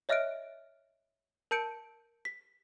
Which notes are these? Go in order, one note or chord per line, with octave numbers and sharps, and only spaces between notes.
C#5 D#5 E5 F6 F#6 D7
A#4 A5 G6 C#7 D7
B6